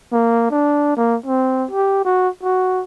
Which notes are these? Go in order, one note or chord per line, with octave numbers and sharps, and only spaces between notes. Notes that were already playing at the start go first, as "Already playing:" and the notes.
A#3
D4
A#3
C4
G4
F#4
F#4